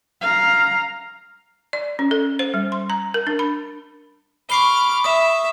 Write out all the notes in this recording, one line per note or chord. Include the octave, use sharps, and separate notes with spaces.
F5 A#5
D5
C#4
A4
C5
G3
C6
A#5
A#4
D4
B5
B5 C#6 D6 F6 C7 G7
E5 D#6